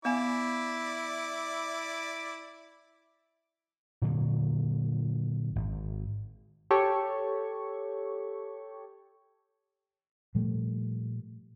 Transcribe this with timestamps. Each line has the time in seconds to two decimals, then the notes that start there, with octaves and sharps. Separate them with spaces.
0.05 B3 E4 D5 F5 G#5
4.02 A#2 D3 F#3 A#3
5.56 G#1
6.71 G4 A4 C#5 C#6
10.35 A#2 F3 G3 A3